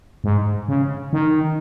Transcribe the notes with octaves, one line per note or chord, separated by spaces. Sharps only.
G#2
C#3
D#3